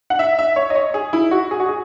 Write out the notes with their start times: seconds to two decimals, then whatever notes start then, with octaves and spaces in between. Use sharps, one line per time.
0.10 F#5
0.19 E5
0.39 E5
0.56 C#5
0.70 D#5
0.75 C#5
0.94 G#4
1.13 E4
1.31 F#4
1.51 G#4
1.60 F#4
1.69 G#4